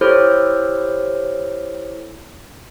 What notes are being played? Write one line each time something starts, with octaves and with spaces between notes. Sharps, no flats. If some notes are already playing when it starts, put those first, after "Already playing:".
E4 G4 A4 C5 C#5 F6